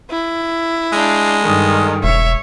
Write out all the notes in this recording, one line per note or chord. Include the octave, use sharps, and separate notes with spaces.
E4
G#3 D4 F5 G6
G2 D3 D#3
E1 C#5 E5